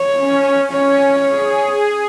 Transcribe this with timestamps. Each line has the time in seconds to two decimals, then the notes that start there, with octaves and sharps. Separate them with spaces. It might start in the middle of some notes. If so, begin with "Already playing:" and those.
Already playing: C#5
0.17 C#4
0.72 C#4 C#5
1.27 G#4